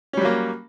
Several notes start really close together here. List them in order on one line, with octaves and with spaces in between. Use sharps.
C#4 G3 F#3 A#3